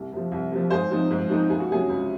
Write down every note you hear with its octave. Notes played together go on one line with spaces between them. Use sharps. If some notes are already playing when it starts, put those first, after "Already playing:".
Already playing: C2
C3 F3
C2
C3 F3
G#2 G#4 C5
F3 C4 D#4
G#2
F3 C4 D#4
C#2 G#4
F#4
C3 F#3 C#4 G#4
C#2